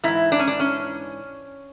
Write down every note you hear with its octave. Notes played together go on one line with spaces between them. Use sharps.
G#2 E3 E4
D4
C#4
D4
C#4